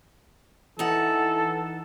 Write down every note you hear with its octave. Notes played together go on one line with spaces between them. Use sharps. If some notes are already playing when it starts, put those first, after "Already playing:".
E3 D#4 A4 F#5